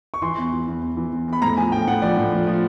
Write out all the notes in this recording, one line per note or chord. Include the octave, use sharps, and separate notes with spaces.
C#6
E3 C6
E2
E3
E2
E2
E3
E2
E2 B5
A2 A#5
F3 G#5
A2 G5
A2 F#5
F3 D5
A2
F3
F3